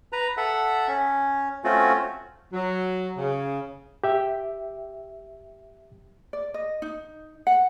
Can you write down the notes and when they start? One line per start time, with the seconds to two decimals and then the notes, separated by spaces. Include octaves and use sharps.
0.12 B4 A#5
0.37 A4 E5 F#5
0.88 C#4
1.64 A3 C4 C#4 F4 F#4
2.53 F#3
3.17 C#3
4.04 G4 E5 G5
6.33 D5
6.54 D#5
6.82 D#4
7.47 F#5